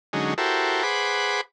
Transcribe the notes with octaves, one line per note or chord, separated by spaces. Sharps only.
D3 F#3 G#3 C#4 D#4
E4 F#4 G4 A4 A#4 C5
G#4 B4 C5 F#5 B5 D6